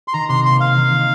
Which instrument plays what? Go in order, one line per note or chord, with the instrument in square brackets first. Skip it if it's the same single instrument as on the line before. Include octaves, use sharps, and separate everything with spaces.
[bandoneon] C6
[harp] D#3 [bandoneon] A#5
[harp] C3 [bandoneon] C6
[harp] A#3 [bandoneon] C6
[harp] A#3 [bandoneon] F5
[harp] D#3
D#3